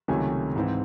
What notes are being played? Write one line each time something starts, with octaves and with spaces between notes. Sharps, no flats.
C#2 C3 D#3 F#3 A3 G#5
G#2 E3 C4